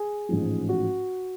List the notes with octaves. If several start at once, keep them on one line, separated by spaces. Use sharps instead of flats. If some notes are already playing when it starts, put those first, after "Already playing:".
Already playing: G#4
A1 G#2 F3
F#4